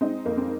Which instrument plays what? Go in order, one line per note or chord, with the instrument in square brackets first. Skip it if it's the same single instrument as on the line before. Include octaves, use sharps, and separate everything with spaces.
[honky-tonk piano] G#3 C4 D#4
F2 A#3
C4